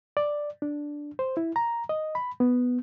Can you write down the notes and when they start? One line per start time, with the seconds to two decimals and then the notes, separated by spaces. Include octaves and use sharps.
0.17 D5
0.62 D4
1.19 C5
1.37 E4
1.56 A#5
1.89 D#5
2.15 B5
2.40 B3